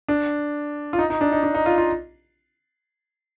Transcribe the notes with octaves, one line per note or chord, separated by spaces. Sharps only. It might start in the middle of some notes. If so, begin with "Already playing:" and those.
D4
F4
D#4
D#4
D4
D#4
D4
D#4
F4
F4